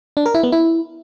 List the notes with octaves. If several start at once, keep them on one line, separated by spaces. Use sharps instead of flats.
D4
A#4
E4
B3
E4